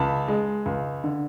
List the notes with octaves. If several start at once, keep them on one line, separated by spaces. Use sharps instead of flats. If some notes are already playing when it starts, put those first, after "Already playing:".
Already playing: C#2 A5 B5
G#3
C#2
D3